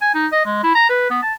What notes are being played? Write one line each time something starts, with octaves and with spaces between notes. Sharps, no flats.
G#5
D#4
D#5
G#3
E4
A#5
B4
B3
A5